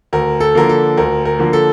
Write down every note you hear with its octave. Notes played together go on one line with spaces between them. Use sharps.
D2 A#4
A4
D3 F3 A#3 A#4
A4
D2 A#4
A#4
D3 F3 A#3
A4